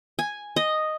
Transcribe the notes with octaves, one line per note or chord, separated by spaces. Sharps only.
G#5
D#5